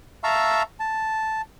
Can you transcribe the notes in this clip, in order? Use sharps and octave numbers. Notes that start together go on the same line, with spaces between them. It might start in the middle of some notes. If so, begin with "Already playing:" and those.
E5 F5 A5 A#5 C#6 E6
A5